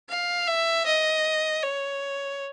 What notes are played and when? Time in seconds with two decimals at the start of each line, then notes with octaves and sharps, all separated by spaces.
0.09 F5
0.47 E5
0.86 D#5
1.62 C#5